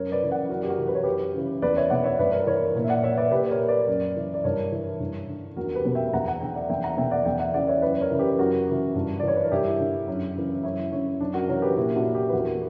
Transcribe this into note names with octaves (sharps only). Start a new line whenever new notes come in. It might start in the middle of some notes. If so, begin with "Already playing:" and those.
Already playing: F#2 A#4 C#5
B4 D5
C#3 E3
D5 F#5
F#2 F#4 A#4
G4
F#4 A#4
E3
B4
C#5
F#2 G4 B4
C#3 E3
E2 B4 D5
C#5 E5
B2 D5 F#5
C#5 E5
G2 B4 D5
A#4
B4
E3 A#4 C#5
A#2
E5
D5 F#5
C#5 E5
B4 D5
A#2 G4 B4
A#4 C#5
B4 D5
F#2
E3
D5
G2 A#4 C#5
E3
G2
D3
E2 F#4 A#4
G4 B4
B2
E5 G5
E2 F#5 A#5
F#5 A#5
D3 E5 G5
D5 F#5
E2 E5 G5
F#5 A#5
B2 E5 G5
D5 F#5
E2 E5 G5
D5 F#5
C#3 E3 D5 F#5
C#5 E5
F#2 B4 D5
A#4 C#5
C#3 E3
G4 B4
F#2 F#4 A#4
C#3 E3
G2
D5
E3 C#5
B4
A#4
G2 E4 G4
D3
F#2
C#3 E3
F#2 C#4 E4
D3 C#4
F#2 D4
F#4 A#4
E3 A#4 C#5
G4 B4
A#2 E4 G4
D4 F#4
E4 G4
B4
E2 F#4 A#4